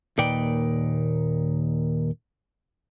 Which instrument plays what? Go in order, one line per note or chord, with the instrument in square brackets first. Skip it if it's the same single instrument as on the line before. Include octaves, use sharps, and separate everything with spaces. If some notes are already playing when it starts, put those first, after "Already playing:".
[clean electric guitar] D#2 A#2 D#4 B4 D5 G5